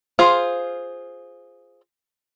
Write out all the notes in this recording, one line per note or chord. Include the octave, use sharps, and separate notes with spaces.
F4 G#4 C5